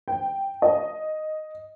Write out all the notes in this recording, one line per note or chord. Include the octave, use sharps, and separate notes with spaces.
G5
D#5